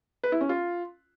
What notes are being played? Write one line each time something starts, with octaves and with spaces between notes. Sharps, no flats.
B4
E4
C#4
F4